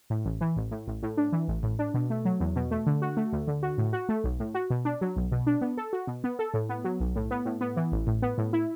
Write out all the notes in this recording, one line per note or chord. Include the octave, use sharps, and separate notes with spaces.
A2
A1
E3
A1
A2
A1
A2
D4
E3
A1
A2
D4
B2
A3
F#3
E2
B2
A3
D3
F#4
A3
D2
D3
F#4
A2
F#4
A3
B1
A2
F#4
B2
D4
F#3
B1
B2
D4
B3
A4
F#4
B2
B3
A4
A2
B3
F#3
B1
A2
B3
A2
B3
E3
A1
A2
B3
A2
E4